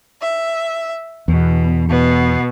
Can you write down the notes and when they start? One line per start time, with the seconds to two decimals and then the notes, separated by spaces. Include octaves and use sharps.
0.22 E5
1.28 E2 B2
1.88 B2 B3